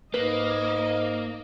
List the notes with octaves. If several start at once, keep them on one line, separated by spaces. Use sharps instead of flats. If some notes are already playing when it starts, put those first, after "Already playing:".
G#2 A#3 B4 D#5